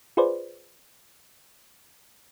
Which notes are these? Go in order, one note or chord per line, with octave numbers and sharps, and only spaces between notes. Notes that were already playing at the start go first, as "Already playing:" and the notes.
F4 G#4 B4 C5 D5